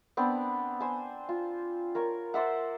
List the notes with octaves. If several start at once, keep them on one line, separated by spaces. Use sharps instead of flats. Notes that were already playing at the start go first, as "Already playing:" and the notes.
B3 C4 D4
C5 G#5
F4
A#4 C#5 C#6
C5 D5 E5 F#5